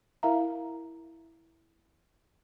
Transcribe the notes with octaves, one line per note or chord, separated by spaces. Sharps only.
E4 A#4 E5 F5 A#5